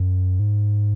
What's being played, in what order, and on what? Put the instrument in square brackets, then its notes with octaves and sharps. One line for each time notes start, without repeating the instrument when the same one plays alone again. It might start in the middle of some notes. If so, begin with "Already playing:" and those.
Already playing: [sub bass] F#2
G#2